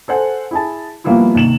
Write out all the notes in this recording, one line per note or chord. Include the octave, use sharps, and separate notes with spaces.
A4 C5 F#5 G#5
E4 G#4 A5
F3 G3 A#3 B3 E4 F4
D#2 C3 E7 F#7